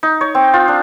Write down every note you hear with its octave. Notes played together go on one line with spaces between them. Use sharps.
D#4
C#5
C4
F4
D4